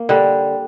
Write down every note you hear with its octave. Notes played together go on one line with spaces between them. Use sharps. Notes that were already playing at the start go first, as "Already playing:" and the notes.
Already playing: A#3
D3 G3